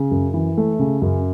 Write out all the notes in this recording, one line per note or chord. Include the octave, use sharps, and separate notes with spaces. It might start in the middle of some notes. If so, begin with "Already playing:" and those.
Already playing: C#3
F#2
E3
A3
C#3
F#2